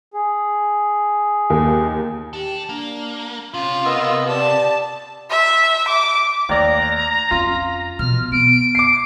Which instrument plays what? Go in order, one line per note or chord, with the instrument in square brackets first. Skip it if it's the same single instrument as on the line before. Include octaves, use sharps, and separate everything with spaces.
[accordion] G#4
[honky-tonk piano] D#2
[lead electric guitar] D4 A4 [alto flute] G4
[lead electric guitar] A#3 [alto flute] D4
[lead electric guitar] C3 [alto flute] C#4 [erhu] F4
[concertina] B3 D#5 E6 [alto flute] A#4
[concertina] G4 [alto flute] D5 [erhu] A5
[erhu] E5
D6
[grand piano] D#2 D5 [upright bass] A3 [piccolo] A#5
[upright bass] F2 C#4 [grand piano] F4
[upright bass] B2 E3 [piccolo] F6
[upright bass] B3 [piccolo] D7
[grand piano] D6 C7